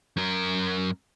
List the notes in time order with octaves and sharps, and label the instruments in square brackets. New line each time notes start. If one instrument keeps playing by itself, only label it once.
[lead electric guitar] F#2 A#4